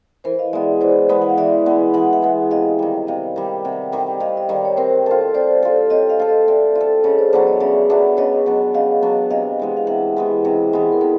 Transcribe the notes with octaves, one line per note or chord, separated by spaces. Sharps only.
E3 A#4 C5
D#5 F5
G#3 B3 D5 E5
E3 C5 D5
G#3 B3
F#5
F5
E3 D5 E5
G#3 B3
E3 F#5
E5 F#5
G#3 B3
C3 D#5 F5
D#3 G3
C3 D#5 F5
D#3 G3
C3 E5 F#5
D#3 G3
C3 D#5 F5
D#5
D#3 G3 D5
C#5
C4 A#4 C5
F4 A4
C4 C5 D5
F4 A4
C4 C#5 D#5
D#5 F5
F4 A4
D#5 F5
C4 D5 E5
F4
A4
C#3 C#5 D#5
C5 D5
F#3 B3 D4 C5 D5
C#5 D#5
C#3 D5 E5
F#3 B3 D4 D5 E5
C#3 C#5 D#5
F#3 B3 D4
C#3 D#5 F5
F#3 B3 D4
C3 D#5 F5
E3 G#3 B3
F5
C3 E5 F#5
E3 G#3 B3
C3 D#5 F5
E3 G#3 B3
A#4
C3 A4 B4